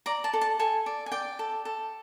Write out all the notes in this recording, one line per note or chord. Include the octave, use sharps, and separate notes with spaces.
D5 A#5
A5
A4
A5
A4 G#5
D5
G#5
D5 G5
A4
A4